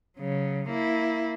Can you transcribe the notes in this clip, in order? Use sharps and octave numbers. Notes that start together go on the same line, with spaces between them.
C#3 F#3
A#3 E4